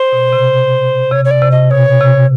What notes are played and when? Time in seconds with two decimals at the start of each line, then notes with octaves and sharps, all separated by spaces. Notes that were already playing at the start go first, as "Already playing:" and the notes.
Already playing: C5
0.12 B2
0.33 C3
1.12 C3 C#5
1.25 C#5
1.31 D5
1.42 C3
1.51 D#5
1.70 B2 C#5
2.01 C3